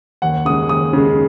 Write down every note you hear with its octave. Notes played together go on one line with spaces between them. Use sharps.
D#2 F#5
C#3 G#3 D#6
D#2 D#6
C#3 G#3